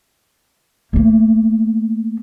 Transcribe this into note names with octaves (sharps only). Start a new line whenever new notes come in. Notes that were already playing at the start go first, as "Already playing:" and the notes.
A3 A#3